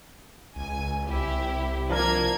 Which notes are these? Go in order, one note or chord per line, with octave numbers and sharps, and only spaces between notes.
C#2 G#5
C2 E4 G4
F3 A#3 D4 A#4 G#6